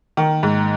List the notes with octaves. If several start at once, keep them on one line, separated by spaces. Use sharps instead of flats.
D#3
G#2